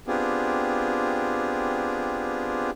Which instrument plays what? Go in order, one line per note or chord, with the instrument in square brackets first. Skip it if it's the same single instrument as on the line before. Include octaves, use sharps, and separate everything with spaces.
[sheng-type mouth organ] B3 C4 D4 F4 G4 G#4